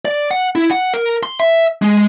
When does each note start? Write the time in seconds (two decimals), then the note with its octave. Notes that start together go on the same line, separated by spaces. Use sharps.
0.05 D5
0.31 F#5
0.55 E4
0.71 F#5
0.94 A#4
1.23 C6
1.39 E5
1.82 G#3